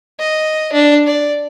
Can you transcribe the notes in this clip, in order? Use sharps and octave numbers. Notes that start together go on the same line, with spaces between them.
D#5
D4
D5